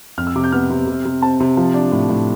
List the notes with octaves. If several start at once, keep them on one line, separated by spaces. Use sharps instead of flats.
F2 F6
E6
C3 D6
G6
B3 F6
C3
C3
C3
C4 A5
C3
F3
D4
A2
A2